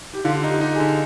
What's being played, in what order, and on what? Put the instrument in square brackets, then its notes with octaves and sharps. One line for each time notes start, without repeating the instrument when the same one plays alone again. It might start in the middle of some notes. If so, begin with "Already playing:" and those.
[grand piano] G4
[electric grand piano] D3 [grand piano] F4
[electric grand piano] D#4
[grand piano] G4
[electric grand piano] D#4
[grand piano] G#4
[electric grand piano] D3